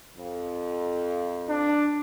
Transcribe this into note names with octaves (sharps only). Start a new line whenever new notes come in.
F2
D4